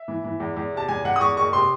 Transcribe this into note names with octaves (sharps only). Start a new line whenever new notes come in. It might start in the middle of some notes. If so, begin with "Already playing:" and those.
Already playing: E5
E3
E3
E2
E2
C3 A5
E2 G#5
E2 F#5
D#6
E2 C#6
F#1 C#6
C3 C6